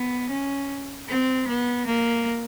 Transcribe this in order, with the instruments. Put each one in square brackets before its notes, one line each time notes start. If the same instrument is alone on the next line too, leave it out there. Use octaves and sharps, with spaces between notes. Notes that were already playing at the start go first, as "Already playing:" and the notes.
Already playing: [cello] B3
C#4
C4
B3
A#3